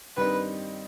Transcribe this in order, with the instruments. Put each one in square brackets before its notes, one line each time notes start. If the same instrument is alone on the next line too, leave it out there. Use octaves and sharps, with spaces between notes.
[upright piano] G2 D#3 G3 C4 D#4 [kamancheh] B4